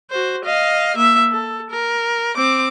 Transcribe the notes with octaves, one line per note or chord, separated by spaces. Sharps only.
F#4 C5
D#5 F5
A#3 E5
A4
A#4
C4 D6